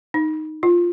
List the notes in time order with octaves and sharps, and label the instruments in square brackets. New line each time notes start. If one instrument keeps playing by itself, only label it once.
[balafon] D#4
F4